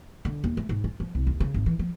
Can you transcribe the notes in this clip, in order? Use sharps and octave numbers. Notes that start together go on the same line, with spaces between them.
D3
D#2
A3
G#2
F4
F3
C2
D#2
C#3
G#1
E3
F3